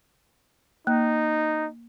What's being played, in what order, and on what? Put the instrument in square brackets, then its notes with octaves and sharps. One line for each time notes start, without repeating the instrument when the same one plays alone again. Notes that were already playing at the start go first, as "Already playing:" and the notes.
[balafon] A#3 [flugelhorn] D#4